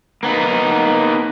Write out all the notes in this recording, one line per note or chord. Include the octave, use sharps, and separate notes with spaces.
A#3 B3 D#4